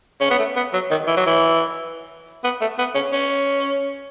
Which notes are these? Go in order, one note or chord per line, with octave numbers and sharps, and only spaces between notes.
C#4
B3
A3
B3
F#3
D#3
E3
F#3
E3
B3
A3
B3
C#4
C#4